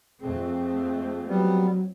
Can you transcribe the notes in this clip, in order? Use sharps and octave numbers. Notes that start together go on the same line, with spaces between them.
F2 A3 C4 G#4
F#3 G3 B3